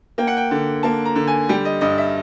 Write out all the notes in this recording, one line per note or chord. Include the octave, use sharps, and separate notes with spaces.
A#3 G5
F#5
G5
D3
A#3 A5
A#5
D3
G#5
G3 G5
D#5
G2 D#5
E5